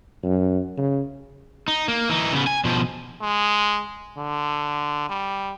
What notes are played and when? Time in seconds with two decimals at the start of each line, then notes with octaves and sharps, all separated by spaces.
0.23 F#2
0.77 C#3
1.68 D#4
1.88 A#3
2.09 E3 D#4
2.32 C#3 B3
2.47 G#5
2.65 B2 F3
3.21 G#3
4.18 D3
5.09 G3